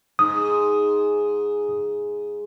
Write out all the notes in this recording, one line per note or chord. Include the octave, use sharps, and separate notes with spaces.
G#2 D#6